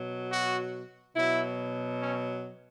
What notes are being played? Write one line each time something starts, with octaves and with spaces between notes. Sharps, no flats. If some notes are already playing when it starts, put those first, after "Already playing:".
Already playing: B2 F#3
F#4
B2 F#3 E4
C#4